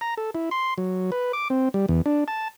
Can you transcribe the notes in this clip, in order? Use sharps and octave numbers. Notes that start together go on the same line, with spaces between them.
A#5
A4
E4
C6
F#3
B4
D6
C4
G3
E2
D4
A5